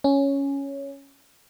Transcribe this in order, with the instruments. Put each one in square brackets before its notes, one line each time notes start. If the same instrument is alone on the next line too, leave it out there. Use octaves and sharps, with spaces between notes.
[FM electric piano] C#4